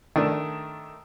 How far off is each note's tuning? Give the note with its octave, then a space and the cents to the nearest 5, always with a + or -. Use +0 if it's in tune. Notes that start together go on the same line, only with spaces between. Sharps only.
D#3 +0 A3 +0 D4 +0